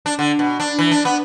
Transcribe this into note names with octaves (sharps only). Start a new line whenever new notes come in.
D4
D3
B2
D4
E3
D4
B3